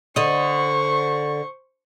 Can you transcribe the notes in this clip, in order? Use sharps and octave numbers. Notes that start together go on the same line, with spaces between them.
D3 C5 D#5 C#6